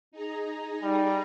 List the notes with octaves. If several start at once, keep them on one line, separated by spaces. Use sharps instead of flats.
D#4 G#4 A#5
G3